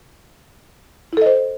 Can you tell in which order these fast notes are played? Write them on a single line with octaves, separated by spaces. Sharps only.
E4 A4 D#5 C5